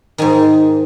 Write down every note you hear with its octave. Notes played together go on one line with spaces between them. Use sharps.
G#2 D#3 G#5